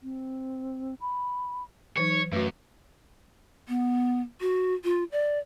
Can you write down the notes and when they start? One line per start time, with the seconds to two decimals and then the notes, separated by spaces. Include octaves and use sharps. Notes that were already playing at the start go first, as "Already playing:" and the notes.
0.03 C4
1.01 B5
1.97 E3 F#3 D#4 C#5
2.32 F#2 A3 F#4 B4
3.68 B3
4.41 F#4
4.84 F4
5.12 D5